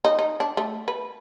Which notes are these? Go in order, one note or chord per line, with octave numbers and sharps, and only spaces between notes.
D#4
D#4
D4
A3
B4